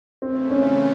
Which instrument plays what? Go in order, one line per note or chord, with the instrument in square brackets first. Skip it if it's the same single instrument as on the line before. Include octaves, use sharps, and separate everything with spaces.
[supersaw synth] C#3 E3 A3 [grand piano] C4
[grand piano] C#4